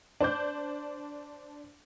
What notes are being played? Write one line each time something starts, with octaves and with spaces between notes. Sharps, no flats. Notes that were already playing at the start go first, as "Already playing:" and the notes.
D4 C5 D6 G6